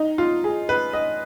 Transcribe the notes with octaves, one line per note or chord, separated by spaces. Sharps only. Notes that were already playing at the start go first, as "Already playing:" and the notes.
Already playing: D#4
F4
G#4
B4
D#5